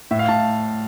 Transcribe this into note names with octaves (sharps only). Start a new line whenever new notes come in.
A2 E5
F5
A2 A5